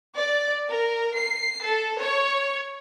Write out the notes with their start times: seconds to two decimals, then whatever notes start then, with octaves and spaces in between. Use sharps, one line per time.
0.17 D5
0.69 A#4
1.16 C7
1.65 A4
2.01 C#5